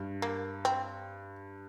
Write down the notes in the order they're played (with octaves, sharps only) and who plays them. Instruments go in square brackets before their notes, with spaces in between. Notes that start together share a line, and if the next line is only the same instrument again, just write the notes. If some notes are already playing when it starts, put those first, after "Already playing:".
Already playing: [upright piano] G2
[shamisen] A#3
C4